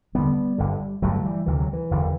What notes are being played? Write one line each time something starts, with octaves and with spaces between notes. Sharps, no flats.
E1 D2 D3 G3 B3
G1 G2 D3
G1 G2 D3 F#3 A3
E3 G3
D2 C3 E3
F#3
E3
F#1 E2 D3